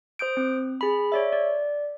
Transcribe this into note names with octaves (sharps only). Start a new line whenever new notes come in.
C5 D#6 G6 D7
C4
G#4 B5
C#5 D5 E5
D5